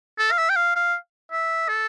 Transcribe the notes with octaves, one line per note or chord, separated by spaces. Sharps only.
A4
F5
E5
G5
F5
F5
E5
A4